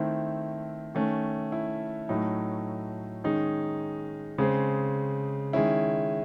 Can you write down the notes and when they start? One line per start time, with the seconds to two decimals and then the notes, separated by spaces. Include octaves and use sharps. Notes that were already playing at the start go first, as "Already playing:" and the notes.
Already playing: D#3 A3 C4 E4
0.95 D#3 A3 C#4
1.52 E4
2.09 A2 F#3 A3 D#4
3.24 D#3 G#3 C#4 D#4
4.38 C#3 G#3 C4
5.53 D#3 G#3 C#4 E4